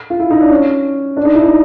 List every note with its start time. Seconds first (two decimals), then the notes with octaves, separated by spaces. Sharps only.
0.10 F4
0.19 E4
0.30 D#4
0.41 D4
0.50 C#4
1.17 D4
1.25 D#4
1.34 E4
1.43 D#4